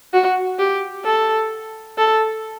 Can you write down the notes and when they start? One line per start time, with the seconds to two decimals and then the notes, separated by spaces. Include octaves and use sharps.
0.13 F#4
0.59 G4
1.04 A4
1.98 A4